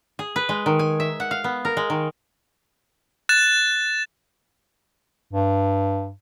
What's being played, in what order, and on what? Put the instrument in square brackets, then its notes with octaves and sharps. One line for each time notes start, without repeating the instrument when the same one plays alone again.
[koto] G#4
B4
G#3
D#3
G#5
E5
F#5
F5
B3
A#4
G#3
D#3
[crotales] F#6 A6 E7
[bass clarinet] G2